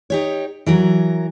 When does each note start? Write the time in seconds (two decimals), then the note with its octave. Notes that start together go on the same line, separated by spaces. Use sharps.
0.10 D#4 G4 C#5
0.66 E3 F#3 A#4